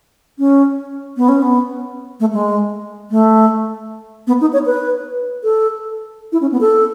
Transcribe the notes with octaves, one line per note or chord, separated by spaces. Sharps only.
C#4
B3
C#4
B3
A3
G#3
A3
B3
D#4
C#5
B4
A4
E4
C#4
B3
A4